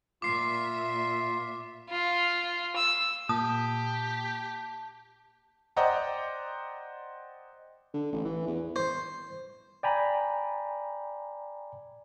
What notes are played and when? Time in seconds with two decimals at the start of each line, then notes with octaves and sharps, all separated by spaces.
0.22 A#2 F4 E5 D6 C7
1.90 F4
2.76 E6
3.29 A#2 G4 A5 D#6
5.77 C5 D5 D#5 F#5 G5 A#5
7.93 D3
8.12 A1
8.25 E3
8.47 E2
8.76 C5
9.83 D5 G5 G#5 A#5 B5